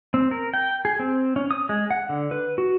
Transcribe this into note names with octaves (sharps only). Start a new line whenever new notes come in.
C4
A#4
G5
G#4
C4
C#4
D#6
G#3
F#5
D3
B4
F#4